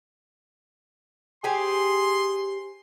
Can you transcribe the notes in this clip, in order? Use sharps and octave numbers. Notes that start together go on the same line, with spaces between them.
G4 G#4 C5 G#5 C6